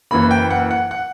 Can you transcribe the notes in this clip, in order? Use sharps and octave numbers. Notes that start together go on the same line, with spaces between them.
F#1 F#2 E3 A#3 B5
G5
F#5
F#5
F#5